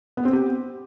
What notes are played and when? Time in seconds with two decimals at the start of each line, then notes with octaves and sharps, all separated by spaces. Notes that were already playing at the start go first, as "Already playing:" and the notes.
0.17 B3
0.25 C4
0.33 G4